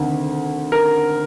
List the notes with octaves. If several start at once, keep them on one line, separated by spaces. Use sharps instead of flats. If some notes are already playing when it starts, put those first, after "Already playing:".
Already playing: D2 C3 D#3
A#4